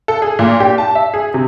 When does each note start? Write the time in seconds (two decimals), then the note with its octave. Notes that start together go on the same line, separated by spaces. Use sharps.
0.08 A4
0.22 G#4
0.39 A#2
0.60 G4
0.78 A5
0.95 E5
1.14 G#4
1.34 C3